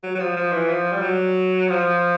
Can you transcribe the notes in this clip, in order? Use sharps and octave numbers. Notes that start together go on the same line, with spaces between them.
F#3
F#3
F3
F3
E3
F3
G3
F#3
F3